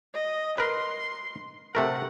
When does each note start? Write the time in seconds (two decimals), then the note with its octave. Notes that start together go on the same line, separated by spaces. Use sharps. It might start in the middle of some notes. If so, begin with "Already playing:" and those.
0.14 D#5
0.58 A#4 B4 C6
1.75 C3 A3 A#4 F#5